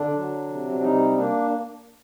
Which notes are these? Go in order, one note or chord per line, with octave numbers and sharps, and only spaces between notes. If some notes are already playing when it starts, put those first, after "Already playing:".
Already playing: D3 D4
F#3
C3
D4
G3 D#4
A#3 D4